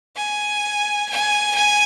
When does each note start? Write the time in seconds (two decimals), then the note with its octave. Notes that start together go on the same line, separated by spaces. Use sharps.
0.16 G#5
1.10 G#5
1.55 G#5